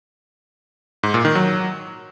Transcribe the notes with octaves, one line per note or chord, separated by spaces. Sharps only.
G#2
A#2
D#3
F#3